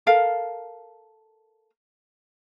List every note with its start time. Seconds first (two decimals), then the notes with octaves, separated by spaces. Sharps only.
0.06 A4 A#4 F5